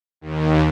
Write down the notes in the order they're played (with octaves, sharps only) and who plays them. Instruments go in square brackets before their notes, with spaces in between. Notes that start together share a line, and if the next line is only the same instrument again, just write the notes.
[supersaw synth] D#2